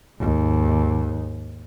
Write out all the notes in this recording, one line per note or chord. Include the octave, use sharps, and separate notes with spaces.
D#2 G#2